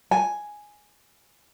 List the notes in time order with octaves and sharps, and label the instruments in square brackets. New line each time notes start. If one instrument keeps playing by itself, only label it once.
[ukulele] G#5